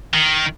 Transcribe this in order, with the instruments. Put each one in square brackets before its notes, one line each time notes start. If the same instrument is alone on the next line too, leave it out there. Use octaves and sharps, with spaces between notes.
[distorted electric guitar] D#3